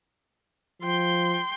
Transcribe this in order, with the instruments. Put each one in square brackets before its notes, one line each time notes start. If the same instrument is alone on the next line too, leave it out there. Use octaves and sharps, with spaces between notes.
[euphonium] F3 [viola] G5 C6